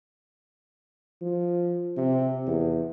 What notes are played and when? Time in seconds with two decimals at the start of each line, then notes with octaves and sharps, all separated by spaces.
1.22 F3
1.97 C3
2.47 E2